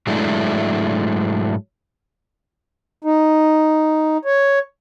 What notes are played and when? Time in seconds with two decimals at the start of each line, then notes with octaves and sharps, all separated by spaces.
0.07 G#2 F#3 G#3 A3 D4 E4
3.04 D#4
4.25 C#5